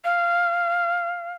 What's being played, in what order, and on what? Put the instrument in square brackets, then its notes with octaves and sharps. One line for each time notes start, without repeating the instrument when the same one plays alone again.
[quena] F5